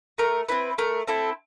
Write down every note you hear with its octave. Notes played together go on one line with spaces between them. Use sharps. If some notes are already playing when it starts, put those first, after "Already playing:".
A3 A#4
C4 E4 B4
A3 A#4
C4 E4 A4